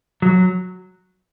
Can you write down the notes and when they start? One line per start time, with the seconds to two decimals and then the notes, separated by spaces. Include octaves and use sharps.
0.22 F#3